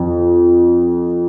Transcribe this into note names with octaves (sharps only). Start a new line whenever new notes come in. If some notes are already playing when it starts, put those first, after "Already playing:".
Already playing: F2